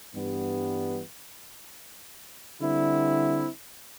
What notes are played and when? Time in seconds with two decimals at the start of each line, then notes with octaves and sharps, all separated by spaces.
0.14 G2 E3 G3 B3
2.61 D3 G3 C4 E4